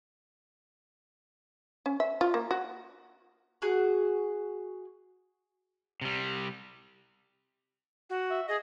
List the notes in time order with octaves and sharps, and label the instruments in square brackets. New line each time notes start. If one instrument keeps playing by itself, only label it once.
[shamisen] C#4
E5
F4
A#3
F#4
[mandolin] F#4 G#4
[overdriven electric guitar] C3 G3
[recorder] F#4
[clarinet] E5
[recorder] G#4 [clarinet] D#5